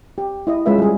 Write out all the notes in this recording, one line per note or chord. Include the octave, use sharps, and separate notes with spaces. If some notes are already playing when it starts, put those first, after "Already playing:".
G4
E4 D#5
G#3 C#4 F4 B4 E5
G3 G#4